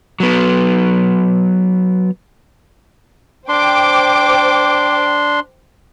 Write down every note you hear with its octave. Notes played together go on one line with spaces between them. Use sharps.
F#3 B3
D4 C5 G5 C6 D6